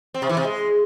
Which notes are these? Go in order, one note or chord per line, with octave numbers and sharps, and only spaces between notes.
C4
C3
E3
C3
G#3